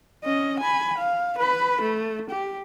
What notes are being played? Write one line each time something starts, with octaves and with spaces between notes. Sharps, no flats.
C#4 D#5
G#5 B5
F5
B4 B5
A3
G4